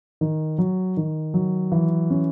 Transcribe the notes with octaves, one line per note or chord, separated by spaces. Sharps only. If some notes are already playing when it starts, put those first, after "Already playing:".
D#3
F#3
D#3
F#3
E3
C#4